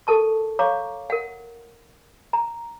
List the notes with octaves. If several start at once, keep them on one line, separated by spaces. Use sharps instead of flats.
A4 A#4 A5 C#6
C#5 F5 A#5 C#6 D6
A#4 F#5
A#5